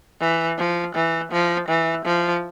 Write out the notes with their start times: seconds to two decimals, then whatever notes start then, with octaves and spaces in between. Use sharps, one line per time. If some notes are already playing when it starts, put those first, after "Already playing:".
0.21 E3
0.58 F3
0.95 E3
1.32 F3
1.68 E3
2.05 F3